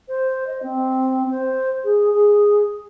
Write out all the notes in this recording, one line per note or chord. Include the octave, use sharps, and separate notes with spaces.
C5
D#5
C4
C5
G#4
G#4